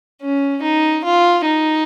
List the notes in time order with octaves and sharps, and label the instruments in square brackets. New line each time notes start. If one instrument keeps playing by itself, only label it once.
[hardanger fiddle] C#4
D#4
F4
D#4